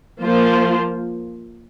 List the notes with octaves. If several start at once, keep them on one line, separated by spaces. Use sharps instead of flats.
F3 A#3 F4 C5